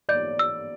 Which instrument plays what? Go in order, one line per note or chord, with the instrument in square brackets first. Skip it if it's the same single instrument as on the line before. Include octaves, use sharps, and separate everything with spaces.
[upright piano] D5 [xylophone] G6
[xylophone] E6